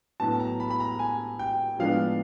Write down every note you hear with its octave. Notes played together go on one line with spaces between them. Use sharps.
A2 F#3 B3 A5
A#5
B5
B5
A#5
G#5
G5
A2 F3 G#3 B3 D4 F5